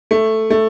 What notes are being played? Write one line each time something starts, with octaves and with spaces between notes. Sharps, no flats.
A3
A3